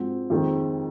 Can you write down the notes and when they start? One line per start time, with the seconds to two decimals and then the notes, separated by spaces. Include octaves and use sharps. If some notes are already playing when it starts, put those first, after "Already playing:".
Already playing: G#2 F3 C4 F#4
0.30 F2 D#3 G#3 C4